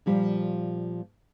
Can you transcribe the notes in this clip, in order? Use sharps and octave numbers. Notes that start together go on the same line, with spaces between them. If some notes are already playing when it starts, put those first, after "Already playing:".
A#2 F3 G3